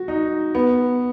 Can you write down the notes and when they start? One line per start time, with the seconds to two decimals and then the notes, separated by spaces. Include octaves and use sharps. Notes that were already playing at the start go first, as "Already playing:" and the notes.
Already playing: F#4
0.08 D#4
0.55 B3